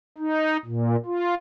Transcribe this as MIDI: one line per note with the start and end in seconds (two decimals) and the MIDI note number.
0.18 0.57 63
0.66 0.96 46
1.05 1.34 65